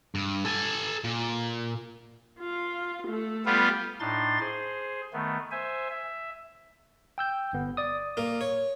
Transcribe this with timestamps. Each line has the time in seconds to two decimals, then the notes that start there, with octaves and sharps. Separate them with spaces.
0.15 G2
0.45 A4 G#5
1.04 A#2
2.40 F4 F5
3.08 A3 A4
3.46 G3 B3 F4
4.00 A2 D4 D#4 C6 A6
4.40 G#4 C5
5.13 D#3 A3 B3
5.51 C5 E5 G#5
5.90 E5
7.18 G5 E6 G6
7.53 G1 B3
7.77 D5 D#6
8.17 A#3 F4
8.41 C#5